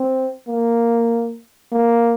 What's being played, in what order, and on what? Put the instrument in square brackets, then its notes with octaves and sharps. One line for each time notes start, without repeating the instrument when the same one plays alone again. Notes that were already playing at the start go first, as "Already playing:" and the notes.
Already playing: [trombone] C4
A#3
A#3